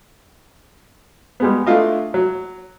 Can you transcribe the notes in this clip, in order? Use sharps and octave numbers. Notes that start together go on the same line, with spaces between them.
G3 G#3 B3
A3 D4 E4 F4 D#5
F#3